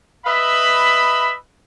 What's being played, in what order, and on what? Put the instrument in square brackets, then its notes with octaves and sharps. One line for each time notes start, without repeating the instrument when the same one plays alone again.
[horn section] B4 D#5 E5 B5